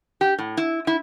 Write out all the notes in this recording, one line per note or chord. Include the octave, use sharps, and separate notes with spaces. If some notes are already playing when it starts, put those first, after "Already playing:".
G4
A2
E4
E4